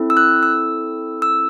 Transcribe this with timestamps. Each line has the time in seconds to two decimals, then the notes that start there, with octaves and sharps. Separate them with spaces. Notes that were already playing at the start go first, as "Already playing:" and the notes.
Already playing: C4 E4 A4
0.10 E6
0.17 F#6
0.43 E6
1.22 E6